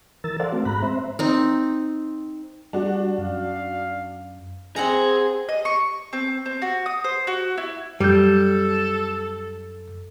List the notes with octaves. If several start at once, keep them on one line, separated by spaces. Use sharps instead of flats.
E3 A#4 E6 A6
A4 A#4 C5 D5 F5 F#5
A3 C4 F#4
G#2 G#3 A#5 B5 F#6
C4 C5 E5
C4 D#4
G3 D4 F#4
F#2 F5
C4 G#4 F#5 A#5
D#5
C#6
C4
C4
F#4
D#6
C5
F#4
E4
F#2 G3 A4 G6